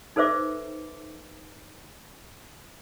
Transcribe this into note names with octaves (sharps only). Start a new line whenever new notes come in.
D#4 A4 B4 C5 E5 D6